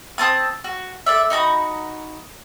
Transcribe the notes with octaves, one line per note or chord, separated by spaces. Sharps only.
C4 A5 D#6
F#4
A4 D5 E5
D#4 F#4 A#5 B5